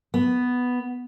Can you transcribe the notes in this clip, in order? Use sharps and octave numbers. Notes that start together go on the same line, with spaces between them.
B3